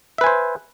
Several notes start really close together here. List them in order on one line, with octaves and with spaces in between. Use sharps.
E5 B4 G#5 C5